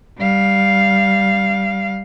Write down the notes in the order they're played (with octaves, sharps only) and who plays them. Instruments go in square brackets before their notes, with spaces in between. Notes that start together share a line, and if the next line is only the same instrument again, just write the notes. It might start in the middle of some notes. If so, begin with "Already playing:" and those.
[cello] G3 F5